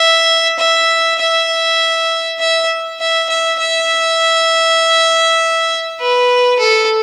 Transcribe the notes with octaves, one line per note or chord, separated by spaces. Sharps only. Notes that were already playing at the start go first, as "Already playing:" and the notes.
Already playing: E5
E5
E5
E5
E5
E5
E5
B4
A4